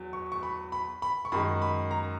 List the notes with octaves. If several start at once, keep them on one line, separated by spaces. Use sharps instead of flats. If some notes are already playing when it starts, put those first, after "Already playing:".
Already playing: E2 F#3
C#6
C#6
B5
B5
B5
C#6
F#2 D#3 G#3 B5
B5
A#5